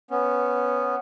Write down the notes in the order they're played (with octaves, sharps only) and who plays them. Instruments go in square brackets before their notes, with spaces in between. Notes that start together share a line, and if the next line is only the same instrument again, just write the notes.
[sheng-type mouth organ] B3 C#4